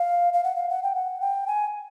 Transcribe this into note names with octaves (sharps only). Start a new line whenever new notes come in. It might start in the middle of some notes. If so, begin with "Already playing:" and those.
Already playing: F5
F5
F#5
F5
F#5
G5
F#5
G5
G#5